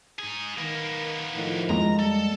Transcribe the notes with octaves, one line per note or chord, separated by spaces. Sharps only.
D#4 G#4
D#3 A#3 B3
A2 D#3 F3
F2 G#3 A#3 A#5
G3 A4